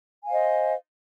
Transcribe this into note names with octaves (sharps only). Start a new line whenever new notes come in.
C5 D#5 F5 G#5